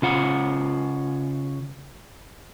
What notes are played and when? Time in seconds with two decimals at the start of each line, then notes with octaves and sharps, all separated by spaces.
0.02 C#3 F4 F#5